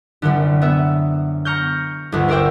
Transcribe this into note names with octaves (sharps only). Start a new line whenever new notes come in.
C2 F#2 D3
B3 E5
A#5 C#6 F6 G6
G1 D2
A#4 C5 D5 E5 G5